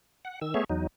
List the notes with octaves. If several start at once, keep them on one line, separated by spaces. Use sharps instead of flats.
F#5
D#3 E6
A3 B3 G#4 C#5 E5
E2 F#3 D#4